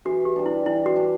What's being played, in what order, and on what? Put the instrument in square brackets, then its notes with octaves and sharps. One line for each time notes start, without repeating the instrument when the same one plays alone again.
[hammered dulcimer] E3 [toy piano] F#4
[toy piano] G4
[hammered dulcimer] G3 D4
[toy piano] E4
[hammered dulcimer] E3 [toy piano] E4
[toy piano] F#4
[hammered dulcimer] G3 D4